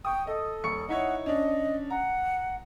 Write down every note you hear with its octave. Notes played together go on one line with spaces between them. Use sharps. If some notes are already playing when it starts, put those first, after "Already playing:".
G5 C#6 D#6
A4 D#5
D#1 C#6 C#7
D#4 E4 C#5 F#5
C#4 D4 D#5
F#5 A#5